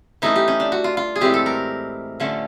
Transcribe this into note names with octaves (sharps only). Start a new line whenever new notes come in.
E3 A3 C#4 D#4
G4
C#4
D4
F#4
F4
F4
G#4
A2 E3 G#3 C4 G4
A4
A#4
D3 F3 A3 C#4